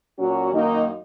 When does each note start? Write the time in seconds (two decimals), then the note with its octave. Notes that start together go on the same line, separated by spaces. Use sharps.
0.19 A#2 F#3 C#4 F#4
0.53 F#2 D#3 A#3 D#4